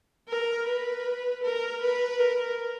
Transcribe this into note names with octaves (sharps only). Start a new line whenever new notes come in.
A#4
B4
A#4
B4
A#4